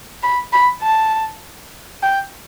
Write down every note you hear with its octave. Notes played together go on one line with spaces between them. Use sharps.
B5
B5
A5
G5